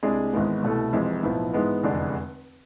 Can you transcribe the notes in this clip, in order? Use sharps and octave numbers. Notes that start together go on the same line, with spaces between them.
C2 C3 G#3 D4 G#4
G#1 G#2 E3 G#3 B3
C2 B2 A3 E4 A4
F1 F2 C3 E3 G#3
B1 A2 F3 B3
G#2 E3 G#3 B3
F1 E2 D3 G#3 D4